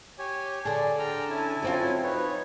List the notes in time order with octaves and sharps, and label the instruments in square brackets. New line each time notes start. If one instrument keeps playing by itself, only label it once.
[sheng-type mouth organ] G4 C#5 G#5
[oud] D3 G#4 [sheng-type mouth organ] D5 [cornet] A5
[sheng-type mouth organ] G5 A#5 F6
C#4 E4 G#5
[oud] F#3 C4 F4
[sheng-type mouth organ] D#4 C#5 [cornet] B4